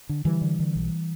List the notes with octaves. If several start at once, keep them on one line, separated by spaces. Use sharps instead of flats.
D3
D3 E3 G3
D3
D3
B1